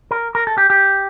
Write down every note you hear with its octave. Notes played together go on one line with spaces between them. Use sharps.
A#4
A#4
A4
G4
G4